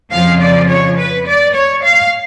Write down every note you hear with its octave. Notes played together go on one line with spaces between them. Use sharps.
F2 C#3 F3 F5
D5
C#5
B4
D5
C#5
F5